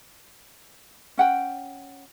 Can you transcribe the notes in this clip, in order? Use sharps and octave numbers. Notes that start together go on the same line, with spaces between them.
C#4 F#5 G5